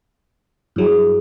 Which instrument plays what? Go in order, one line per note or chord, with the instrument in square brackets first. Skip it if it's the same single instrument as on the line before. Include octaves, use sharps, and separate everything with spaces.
[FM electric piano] G2 F#3 [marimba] E4 G#4